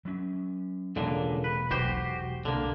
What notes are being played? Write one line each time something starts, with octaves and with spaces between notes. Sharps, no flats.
F#3 C#4
E1 C#2 A#2 D3
B4
B1 G#3 F#4 G4 C5
C2 D3 A#3